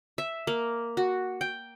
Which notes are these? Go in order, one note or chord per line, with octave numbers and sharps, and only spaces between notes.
E5
A#3
F#4
G5